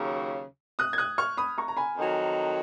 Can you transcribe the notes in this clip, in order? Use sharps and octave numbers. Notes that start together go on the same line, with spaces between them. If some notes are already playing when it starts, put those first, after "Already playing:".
Already playing: D#2 C#3 F#3
D#6 F#6
G#6
D#6 F#6
C#6 F6
B5 D#6
A#5 C#6
A#5
G#5 B5
F2 D#3 F#3